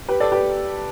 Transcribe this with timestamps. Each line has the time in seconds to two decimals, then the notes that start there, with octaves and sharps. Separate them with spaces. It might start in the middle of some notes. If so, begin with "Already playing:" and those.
0.09 G4 B4
0.20 A4 D5
0.32 G4 B4